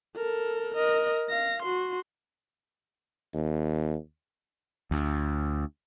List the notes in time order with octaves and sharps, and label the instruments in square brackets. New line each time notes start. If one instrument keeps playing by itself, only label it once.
[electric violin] A4 A#4
A#4 D#5
F5 A#6
F#4 C6
[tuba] D#2
[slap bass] D2